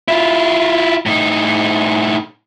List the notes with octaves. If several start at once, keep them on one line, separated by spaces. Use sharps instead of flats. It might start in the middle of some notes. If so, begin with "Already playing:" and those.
E4 F4
A2 D#4